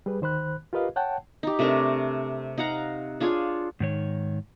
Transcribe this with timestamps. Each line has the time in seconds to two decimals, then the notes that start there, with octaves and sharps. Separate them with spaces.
0.06 G3 G#4 B4
0.21 D2 D#3 C5 B5 F#6
0.73 F4 G4 A#4 B4 D#5 F5
0.96 C#5 F#5 G5 A5
1.43 D#4 G4
1.59 C3 A3 D4 A#4
2.58 D#4 F5 F#5 A#5
3.20 D4 F4 G#4 C#5
3.80 G#2 D#3 C#5